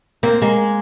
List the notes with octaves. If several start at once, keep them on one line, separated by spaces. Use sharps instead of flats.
A#3 C4
G#3 A#3